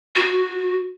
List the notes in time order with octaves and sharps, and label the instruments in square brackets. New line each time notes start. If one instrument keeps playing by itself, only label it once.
[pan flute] F#4